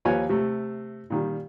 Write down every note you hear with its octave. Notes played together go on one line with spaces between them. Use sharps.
D#2 F3 F4 B4 C#5 G#5
C3 A3
A#2 D#3 G3